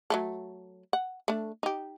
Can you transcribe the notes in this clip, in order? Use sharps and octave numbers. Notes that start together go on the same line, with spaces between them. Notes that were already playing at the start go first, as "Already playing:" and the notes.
F#3 A3 A4
F#5
A3 D4
D#4 G4